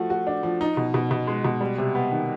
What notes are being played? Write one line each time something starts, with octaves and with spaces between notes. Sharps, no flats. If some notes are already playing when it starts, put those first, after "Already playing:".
Already playing: F3 A3 F#4
F#4
D4
F3
D#4
B2
B2
B2
G#3
B2
G3
C3
B3
D#3